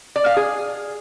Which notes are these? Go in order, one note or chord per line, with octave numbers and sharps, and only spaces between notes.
D5
F5
G#4